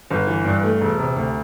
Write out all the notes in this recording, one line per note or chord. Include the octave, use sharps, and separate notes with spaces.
G1
E3
G2
A3
E1
C3
D2